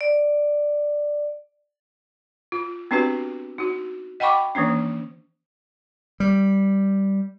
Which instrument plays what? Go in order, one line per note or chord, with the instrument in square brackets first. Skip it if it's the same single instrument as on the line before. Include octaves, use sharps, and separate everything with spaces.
[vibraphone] D5
[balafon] F4
B3 C4 D4 F#4 G4 B4
D#4 F#4
D#5 F#5 G5 B5 C#6 D6
D#3 E3 A#3 C#4 D4
[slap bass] G3